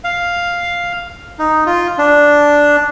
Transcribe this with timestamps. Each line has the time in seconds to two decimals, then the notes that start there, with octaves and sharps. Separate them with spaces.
0.04 F5
1.39 D#4
1.66 F4
1.98 D4